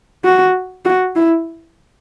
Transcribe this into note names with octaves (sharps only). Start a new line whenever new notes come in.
F#4
F#4
E4